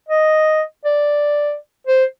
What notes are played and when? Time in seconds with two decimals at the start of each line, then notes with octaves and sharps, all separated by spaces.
0.08 D#5
0.85 D5
1.87 C5